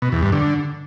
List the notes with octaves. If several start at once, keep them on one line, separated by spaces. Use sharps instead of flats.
B2
E2
G2
D3